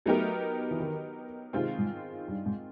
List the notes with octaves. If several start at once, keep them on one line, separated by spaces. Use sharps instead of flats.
F#3 A3 B3 D#4 G4 A#4
E3
D#3
C3 D#3 G#3 C4 F4
G#2
G2
G#2